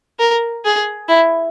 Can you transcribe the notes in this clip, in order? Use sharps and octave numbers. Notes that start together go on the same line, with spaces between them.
A#4
G#4
E4